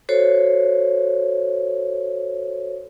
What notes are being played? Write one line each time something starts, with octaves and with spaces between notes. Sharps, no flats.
F#4 A4 C5 C#5